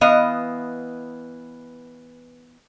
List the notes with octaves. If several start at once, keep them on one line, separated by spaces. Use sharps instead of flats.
E3 B3 D#5 F5